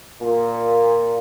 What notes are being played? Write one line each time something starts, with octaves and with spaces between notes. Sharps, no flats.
A#2